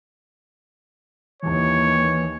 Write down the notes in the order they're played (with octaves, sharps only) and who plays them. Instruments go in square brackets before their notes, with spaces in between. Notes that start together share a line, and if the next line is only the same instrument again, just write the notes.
[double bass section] D#2 [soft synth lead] E3 [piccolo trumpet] C#5